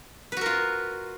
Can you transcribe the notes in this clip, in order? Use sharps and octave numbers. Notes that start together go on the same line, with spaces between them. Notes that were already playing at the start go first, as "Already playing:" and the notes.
F4 F#4 A#4 B4